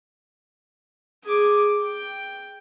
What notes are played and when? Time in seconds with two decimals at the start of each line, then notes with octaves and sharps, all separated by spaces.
1.24 G#4 D6
1.82 G5